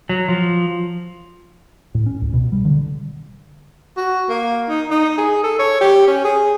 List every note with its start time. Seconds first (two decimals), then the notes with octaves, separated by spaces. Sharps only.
0.09 F#3
0.28 F3
1.95 A2
2.06 C#4
2.22 C#2
2.33 B2
2.52 G3
2.65 D3
3.97 F#4
4.29 A#3
4.69 D#4
4.91 D#4
5.18 G#4
5.43 A4
5.59 C#5
5.81 G4
6.07 C#4
6.24 G#4